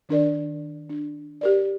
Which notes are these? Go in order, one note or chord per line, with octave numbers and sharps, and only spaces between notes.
D#3 D4 A#4 D5
D4
G4 A#4 D5